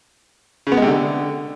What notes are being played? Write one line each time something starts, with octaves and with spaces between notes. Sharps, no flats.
C#3
B3
G#3
C3
D3